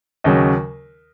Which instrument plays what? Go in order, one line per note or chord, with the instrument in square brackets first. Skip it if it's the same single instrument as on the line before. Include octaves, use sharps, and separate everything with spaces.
[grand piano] D#2 C#3 F#3 D#5